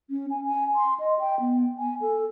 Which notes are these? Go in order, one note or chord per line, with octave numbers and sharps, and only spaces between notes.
C#4
G#5
G#5
C6
D#5
G5
B3
G#5
A4